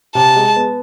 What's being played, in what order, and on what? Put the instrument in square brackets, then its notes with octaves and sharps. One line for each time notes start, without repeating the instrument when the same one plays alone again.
[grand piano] C3 [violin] A5
[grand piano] G#3
B3